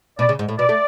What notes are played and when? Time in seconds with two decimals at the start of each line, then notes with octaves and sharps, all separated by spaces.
0.19 B2 D5
0.29 C#3
0.39 G#2
0.48 A2
0.58 B2 D5
0.69 A3